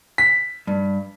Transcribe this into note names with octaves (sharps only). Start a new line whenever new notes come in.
B6
G2